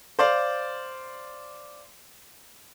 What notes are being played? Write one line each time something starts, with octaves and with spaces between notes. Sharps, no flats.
C5 D5 F5